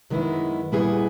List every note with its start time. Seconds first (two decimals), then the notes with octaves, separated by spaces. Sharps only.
0.10 F#2 D#3 G#3 B3 E4
0.72 A#2 G3 B3 E4 G#4